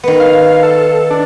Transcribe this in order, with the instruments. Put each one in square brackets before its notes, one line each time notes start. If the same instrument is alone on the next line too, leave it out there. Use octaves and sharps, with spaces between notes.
[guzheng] D#3 B3
[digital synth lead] F5
A4
D4